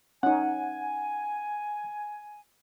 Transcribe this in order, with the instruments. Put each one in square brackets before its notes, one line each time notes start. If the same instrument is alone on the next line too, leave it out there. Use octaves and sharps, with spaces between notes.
[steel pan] C#4 D#4 [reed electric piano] F#5 [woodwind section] G#5